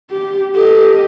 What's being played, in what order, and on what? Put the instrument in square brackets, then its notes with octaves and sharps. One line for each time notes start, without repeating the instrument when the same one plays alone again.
[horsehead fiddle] G4
[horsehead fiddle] G4 D#5 [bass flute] A4